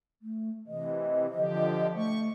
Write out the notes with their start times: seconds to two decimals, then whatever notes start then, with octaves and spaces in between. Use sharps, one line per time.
0.22 A3
0.67 C3 E3 D#5
1.34 D3 F3 G4
1.95 A3 C#6